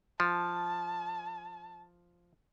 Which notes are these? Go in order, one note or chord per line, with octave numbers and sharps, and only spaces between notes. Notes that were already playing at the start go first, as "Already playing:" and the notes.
F3 A5